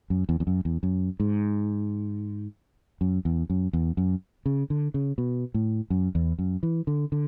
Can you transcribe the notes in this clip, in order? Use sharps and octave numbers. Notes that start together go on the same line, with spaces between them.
F#2
E2
E2
F#2
E2
F#2
G#2
F#2
E2
F#2
E2
F#2
C#3
D3
C#3
B2
A2
F#2
E2
F#2
E3
D3
D3